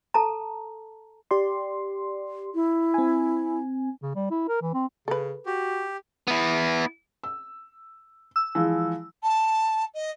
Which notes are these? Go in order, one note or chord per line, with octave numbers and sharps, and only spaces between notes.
A4 A5 A#5
G4 D5 C6
E4
C4 G#5
C#3
G3
E4
A#4
E3
C4
C#3 A4 B4
F#4 G4
B3 E4
E6
E6
E3 F3 G#3
A5
D#5